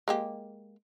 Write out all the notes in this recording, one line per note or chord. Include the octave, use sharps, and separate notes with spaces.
G#3 A#3 G4